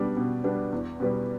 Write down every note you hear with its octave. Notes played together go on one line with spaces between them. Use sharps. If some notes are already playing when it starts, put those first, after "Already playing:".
Already playing: B2 G3 B3 D4
B2
G3 B3 D4
E2
B2 G3 B3